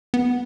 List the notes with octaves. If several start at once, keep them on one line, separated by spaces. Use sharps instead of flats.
B3